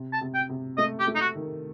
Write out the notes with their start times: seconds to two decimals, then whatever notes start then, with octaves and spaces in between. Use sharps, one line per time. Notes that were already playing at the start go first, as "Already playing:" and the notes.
Already playing: C3
0.13 A5
0.21 C3
0.35 G5
0.49 C3
0.77 A3 D#5
1.00 G4
1.07 A3
1.15 D#4
1.21 F#4
1.35 D#3